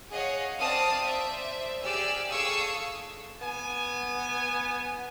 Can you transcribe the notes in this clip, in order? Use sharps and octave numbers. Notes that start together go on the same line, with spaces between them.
G#4 C#5 D#5 F5 F#5
C4 D5 F5 A5 D#6 F6
C5 D5 E5
G4 G#4 D5 E6 F6
G#4 A4 F5 C#6 D#6 E6
B3 G#5